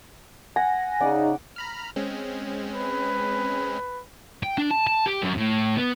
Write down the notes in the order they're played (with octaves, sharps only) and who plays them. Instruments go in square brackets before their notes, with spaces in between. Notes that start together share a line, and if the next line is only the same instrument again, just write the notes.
[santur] F#5 [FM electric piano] G#5 A#6
[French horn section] C#3 D#4 [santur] D5 F#5
[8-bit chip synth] A#5 B5 F6
G#3 C4 C#4
[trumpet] B4
[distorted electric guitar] G5
D4
A5
A5
G4
F#2
A2
B3